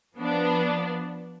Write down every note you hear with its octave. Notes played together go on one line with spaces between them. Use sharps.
F3 B3 D4